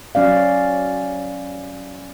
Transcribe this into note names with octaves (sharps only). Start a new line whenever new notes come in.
F#3 C#4 D5 F5